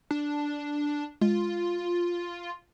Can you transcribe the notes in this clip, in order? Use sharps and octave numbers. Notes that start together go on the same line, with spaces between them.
D4
G#3 F4